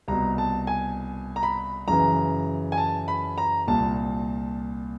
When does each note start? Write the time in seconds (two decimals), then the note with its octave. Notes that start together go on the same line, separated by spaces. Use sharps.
0.08 C2 B2 A#5
0.38 A5
0.67 G#5
1.36 A#5
1.43 B5
1.88 F#2 C#3 E3 A#5
2.72 G#5
2.78 A5
3.08 B5
3.38 A#5
3.67 C2 A#2 A5